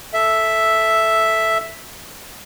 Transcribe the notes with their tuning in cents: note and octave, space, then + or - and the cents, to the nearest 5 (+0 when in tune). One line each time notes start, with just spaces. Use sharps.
A4 -5 E5 +0